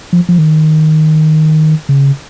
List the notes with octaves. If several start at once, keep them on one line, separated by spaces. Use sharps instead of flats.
F3
F3
D#3
C#3